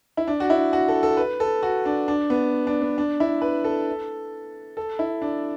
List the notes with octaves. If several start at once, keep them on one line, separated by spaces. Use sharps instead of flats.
E4
D4
F#4
E4
F#4
A4
A4
B4
A4
F#4
D4
D4
B3
D4
B3
D4
E4
B4
A4
A4
E4
D4